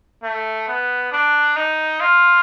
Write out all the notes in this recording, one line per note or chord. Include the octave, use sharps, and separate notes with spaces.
A3
B3
D4
D#4
F4